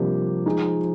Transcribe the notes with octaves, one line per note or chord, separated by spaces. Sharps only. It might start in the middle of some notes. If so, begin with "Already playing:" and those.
Already playing: C3 F3 G3 A#3 D4 G4
G#3 D#4 G#4